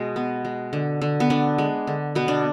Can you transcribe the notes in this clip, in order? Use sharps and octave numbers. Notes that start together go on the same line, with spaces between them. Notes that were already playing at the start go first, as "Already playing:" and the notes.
Already playing: B2 G#3
B3
G#3
D3
D3
B3
D3 D4
G#3
D3
B2 B3
D4